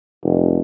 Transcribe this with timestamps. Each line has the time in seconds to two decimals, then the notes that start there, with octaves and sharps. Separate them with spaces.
0.24 F1